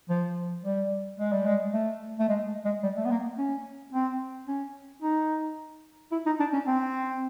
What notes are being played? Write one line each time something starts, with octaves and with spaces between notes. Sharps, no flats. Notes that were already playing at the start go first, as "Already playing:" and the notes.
F3
G3
G#3
G3
G#3
A3
A3
G#3
G#3
G3
A3
B3
A#3
C#4
C4
C#4
D#4
E4
D#4
D4
C#4
C4